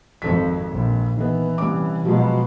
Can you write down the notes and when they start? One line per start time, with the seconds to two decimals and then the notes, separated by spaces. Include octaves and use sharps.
0.22 G#1 F2 A4 B6
0.70 A#1
1.16 D#3 E3 B3
1.58 C2 C#4 D6
2.05 B2 F3 F#3 G#3